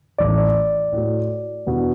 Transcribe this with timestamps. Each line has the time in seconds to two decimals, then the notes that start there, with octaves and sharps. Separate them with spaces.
0.19 A1 A2 E3 D5
0.92 A2 A3 F#4
1.66 E2 B2 B3 D4 F#4